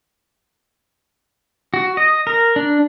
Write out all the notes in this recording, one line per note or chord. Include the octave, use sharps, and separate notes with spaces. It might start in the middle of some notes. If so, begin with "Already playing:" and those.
F#4
D#5
A#4
D4